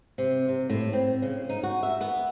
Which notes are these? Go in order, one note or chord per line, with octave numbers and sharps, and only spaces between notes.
C3
C3
A2
C4
C#3
D#4
F#4
E5
B3